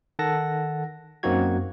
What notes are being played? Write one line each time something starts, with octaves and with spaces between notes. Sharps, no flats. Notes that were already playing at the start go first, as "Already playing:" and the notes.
D#3 A4 F#5 A5 A#6
F#2 A#3 C4 D#4 F#4 G#6